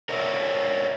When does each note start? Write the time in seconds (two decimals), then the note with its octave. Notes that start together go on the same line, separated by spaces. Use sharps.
0.09 A#4 C#5 D#5 E5